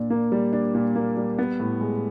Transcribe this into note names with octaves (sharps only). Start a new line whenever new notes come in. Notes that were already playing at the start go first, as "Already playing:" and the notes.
Already playing: A#2 D4
A#3
G3
D4
A#2
A#3
G3
B3
A2
G#3